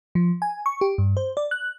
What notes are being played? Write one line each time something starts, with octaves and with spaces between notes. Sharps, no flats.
F3
G#5
C#6
G4
G2
C5
D5
F#6